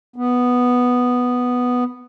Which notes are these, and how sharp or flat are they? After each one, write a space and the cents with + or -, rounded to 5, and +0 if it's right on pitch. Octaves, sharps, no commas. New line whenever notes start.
B3 +0